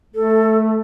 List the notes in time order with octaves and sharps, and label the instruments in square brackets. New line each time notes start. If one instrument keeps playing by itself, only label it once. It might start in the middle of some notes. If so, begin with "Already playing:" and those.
[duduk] A3 [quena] A4